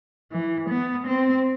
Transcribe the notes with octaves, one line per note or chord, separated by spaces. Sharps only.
E3
B3
C4